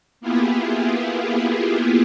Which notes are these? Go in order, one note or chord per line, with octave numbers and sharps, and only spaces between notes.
A#3 B3 E4 F4 G4 G#4